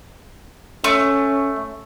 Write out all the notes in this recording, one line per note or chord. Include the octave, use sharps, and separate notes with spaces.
A3 C#4